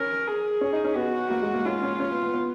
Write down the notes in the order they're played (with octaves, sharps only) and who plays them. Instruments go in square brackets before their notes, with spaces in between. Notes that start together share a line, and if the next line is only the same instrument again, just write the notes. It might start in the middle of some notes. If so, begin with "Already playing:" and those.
Already playing: [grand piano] C#4 [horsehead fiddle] A#4
[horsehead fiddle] G#4
[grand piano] C#4
D#4
C#4
[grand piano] B3 [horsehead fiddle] F#4
[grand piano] A#3
G#3
A#3
[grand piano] C#4 [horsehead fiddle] F4
[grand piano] C#4
C#4
B3
B3
B3